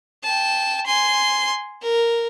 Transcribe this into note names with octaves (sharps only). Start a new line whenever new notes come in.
G5 A5
G#5 C6
A#4